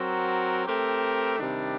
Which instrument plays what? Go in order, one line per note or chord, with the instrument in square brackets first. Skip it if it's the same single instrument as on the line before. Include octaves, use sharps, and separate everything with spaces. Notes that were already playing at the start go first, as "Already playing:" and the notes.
Already playing: [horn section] F#3 C4 F#4 A#4
A3 C4 G4 A#4
C3 D#3 G3 D4